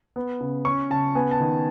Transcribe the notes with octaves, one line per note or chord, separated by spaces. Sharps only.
B3
C#3
C#4 C#6
C#3 A5
B3 G#5
A5
D#3